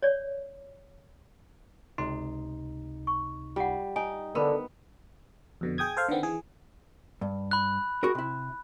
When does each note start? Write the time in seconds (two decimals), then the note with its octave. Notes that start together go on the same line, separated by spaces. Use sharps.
0.03 C#5 D5
1.98 C#2 C3 D#4 C6
3.07 C#6
3.56 G3 F4 F#5
3.96 D#4 G#5
4.35 D3 B3 A#4 C5 B5
5.61 F2 B2 D3
5.78 G#4 G5 D#6 G#6
5.97 A4 C5 F5
6.09 D3 D#3 B3 C4
6.23 E3 G#4
7.21 G2
7.51 B5 F#6
8.03 F#4 G#4 A#4
8.15 C3 E4